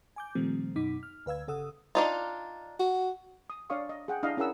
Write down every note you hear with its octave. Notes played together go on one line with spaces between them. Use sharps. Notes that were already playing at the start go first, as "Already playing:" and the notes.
G#5 D6 G6
A#2 D#3 F3 G3 A3 C4
F#2 B2 D#4 D6 B6
F6
D2 B4 F5 E6 G#6
G1 C#3 A4 F#5 D#6 E6
D4 D#4 F4
F#4
D#6
D4 C#5 D5 F5 C#6 D#6
D#5
G#4 F#5 G5
D4 E4 D#5 F5
C#4 E4 G#4 A#4 F#5 E6